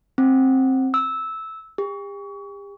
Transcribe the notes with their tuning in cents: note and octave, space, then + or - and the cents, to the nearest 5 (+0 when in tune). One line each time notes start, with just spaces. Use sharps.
C4 +15
E6 -10
G4 +40